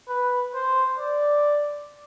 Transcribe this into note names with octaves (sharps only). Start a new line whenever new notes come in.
B4
C5
D5